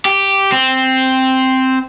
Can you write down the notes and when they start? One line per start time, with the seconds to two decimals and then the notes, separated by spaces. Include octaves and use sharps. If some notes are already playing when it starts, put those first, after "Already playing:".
0.05 G4
0.52 C4